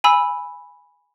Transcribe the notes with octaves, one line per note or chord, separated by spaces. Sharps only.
G#5 B5 E6